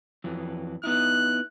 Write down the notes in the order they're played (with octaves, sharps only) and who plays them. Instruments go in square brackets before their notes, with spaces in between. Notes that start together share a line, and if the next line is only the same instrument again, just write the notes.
[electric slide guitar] F2 E3 F#3
[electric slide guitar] B3 D#4 E4 [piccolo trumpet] F#6